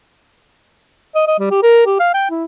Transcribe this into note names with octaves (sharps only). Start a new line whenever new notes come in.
D#5
D#5
G3
G4
A#4
G4
F5
G5
E4